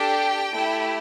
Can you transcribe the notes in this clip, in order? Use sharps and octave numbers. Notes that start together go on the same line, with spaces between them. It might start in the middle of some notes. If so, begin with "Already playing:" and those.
Already playing: D4 G4 A4 G5
A3 E4 G4